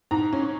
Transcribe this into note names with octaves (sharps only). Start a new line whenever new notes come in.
G#2 A#5
C#4